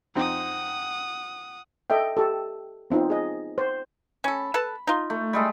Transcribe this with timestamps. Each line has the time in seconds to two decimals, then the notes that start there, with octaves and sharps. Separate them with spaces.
0.16 F2 C4 D#4 F#5 D#6
1.90 A4 D#5 E5 G5
2.17 G4 A4
2.90 B3 C4 D#4 F4
3.10 G#4 D#5
3.58 C5
4.24 C#4 A4 B5
4.54 A4 B4 A5
4.87 D#4 F4
5.10 A3
5.33 G3 G#3 A4